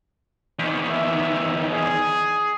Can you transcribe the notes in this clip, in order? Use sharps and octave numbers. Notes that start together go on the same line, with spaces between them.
E2 D#3
E5
G#4